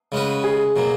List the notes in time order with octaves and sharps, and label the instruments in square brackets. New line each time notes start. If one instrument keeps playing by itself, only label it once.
[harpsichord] C#3 G#3 C#4 F#4 B4
[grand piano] G#4
[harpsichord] B2 F#3 A#3